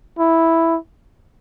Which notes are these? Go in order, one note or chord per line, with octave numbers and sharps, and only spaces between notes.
E4